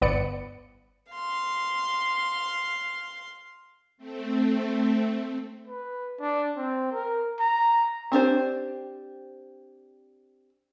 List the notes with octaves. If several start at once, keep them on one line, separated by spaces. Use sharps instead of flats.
G1 B3 D5 C#7
F5 C6
A3 C4
B4
D4
C4
A#4
A#5
C4 D4 G4 C5